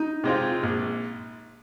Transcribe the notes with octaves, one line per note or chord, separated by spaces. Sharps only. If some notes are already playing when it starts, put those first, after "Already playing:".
Already playing: D#4
C3 G#3 C4 F4
A#1